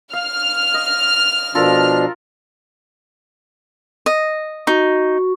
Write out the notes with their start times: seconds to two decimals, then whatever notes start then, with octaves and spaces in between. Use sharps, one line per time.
0.13 F5 F6
0.74 D#5
1.55 B2 F3 D4 F4 A4 A#4
4.06 D#5
4.67 D#4 F#4